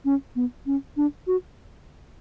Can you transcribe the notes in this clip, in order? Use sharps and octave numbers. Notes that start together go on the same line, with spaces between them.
C#4
B3
C#4
D4
F#4